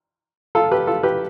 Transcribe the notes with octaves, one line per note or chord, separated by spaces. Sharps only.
F4 A4
G4 B4
F4 A4
G4 B4